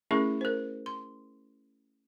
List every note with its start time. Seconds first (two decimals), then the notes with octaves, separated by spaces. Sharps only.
0.11 A3 C#4 E4 G#4 A#4 C#6
0.41 A#4 C5
0.86 C6